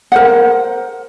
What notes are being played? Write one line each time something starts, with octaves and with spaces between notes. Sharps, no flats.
A#4 C5 F#5